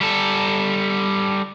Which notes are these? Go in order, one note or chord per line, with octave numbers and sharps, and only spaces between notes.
G3 A4